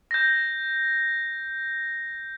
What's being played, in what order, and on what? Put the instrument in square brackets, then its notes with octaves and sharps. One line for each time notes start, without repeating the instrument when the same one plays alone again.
[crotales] G6 A#6